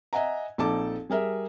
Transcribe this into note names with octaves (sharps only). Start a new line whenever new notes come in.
D#5 E5 F#5 G#5 A#5
A#1 C4 D#4 A4 A5 D6
G3 G#4 A#4 E5